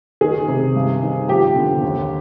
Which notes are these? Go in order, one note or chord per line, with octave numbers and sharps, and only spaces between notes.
D#3 G#4
C3
G2
D#3
F3 G4
D3
D#2